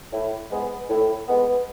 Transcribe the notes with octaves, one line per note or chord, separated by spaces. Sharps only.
A2
G#3 B3
A2
G#3 B3